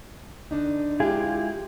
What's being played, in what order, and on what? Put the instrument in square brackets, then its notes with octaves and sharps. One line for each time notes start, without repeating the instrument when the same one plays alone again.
[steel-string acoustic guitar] D3 D4 D#4
[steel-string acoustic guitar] G#3 G4 [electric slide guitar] E4 F4 G#4